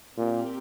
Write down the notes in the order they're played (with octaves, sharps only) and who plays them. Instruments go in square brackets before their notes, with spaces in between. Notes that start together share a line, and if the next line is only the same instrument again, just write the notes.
[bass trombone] A#2 [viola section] C4 G4 A#4